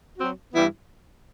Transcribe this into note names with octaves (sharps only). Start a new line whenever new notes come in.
F#3 C4 F#4
G2 E3 G3 B3 E4